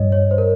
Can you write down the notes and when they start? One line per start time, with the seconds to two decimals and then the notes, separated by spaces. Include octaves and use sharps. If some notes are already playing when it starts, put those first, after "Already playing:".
Already playing: G2 C#5 D#5
0.12 C#5
0.31 C5
0.38 A#4